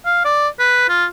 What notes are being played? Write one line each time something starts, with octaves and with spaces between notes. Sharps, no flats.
F5
D5
B4
F4